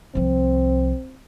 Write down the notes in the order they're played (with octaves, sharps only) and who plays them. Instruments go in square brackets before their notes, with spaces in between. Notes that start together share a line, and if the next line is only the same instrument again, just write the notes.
[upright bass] C2 F3 [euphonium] C4